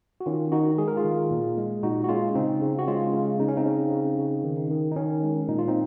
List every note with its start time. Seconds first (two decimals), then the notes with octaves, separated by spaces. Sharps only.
0.21 F#4
0.26 D#3 C#4 F4
0.52 D#3 D#4 F#4
0.78 G#3 G#4
0.88 A#4
0.96 F4 G#4
1.04 D#3
1.31 A#2
1.57 G#3
1.83 A#2 D#4 F#4
2.04 F#4
2.09 G#3 C#4 F4
2.35 C#3 C4 D#4
2.62 C#3
2.79 F#4
2.87 G#3 C#4 F4
3.14 C#3
3.40 C#3 D#4
3.48 C#4
3.57 C4 D#4
3.66 C#3
3.92 C#3
4.18 C#3
4.44 D#3
4.71 D#3
4.92 D#4
4.96 D#3 C#4
5.23 G#3
5.48 A#2 D#4
5.59 F4
5.68 C4 D#4